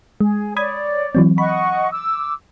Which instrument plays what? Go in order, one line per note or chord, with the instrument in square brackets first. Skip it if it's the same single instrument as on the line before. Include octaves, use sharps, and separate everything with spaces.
[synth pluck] G#3 [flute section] G#4
[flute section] C#5 D5 [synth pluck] B5 D#6 G#6
[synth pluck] E3 F#3 C4
[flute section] D#5 F#5 C#6 [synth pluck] B5
[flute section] D6 E6